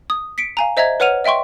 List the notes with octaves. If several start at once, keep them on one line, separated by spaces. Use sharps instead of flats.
D#6
B6 C#7 D7
F5 G#5 A#5
C5 D#5 E5 A#5 G#6
B4 C#5 F#5 F6 D#7 F7
D#5 E5 G5 C6 C#6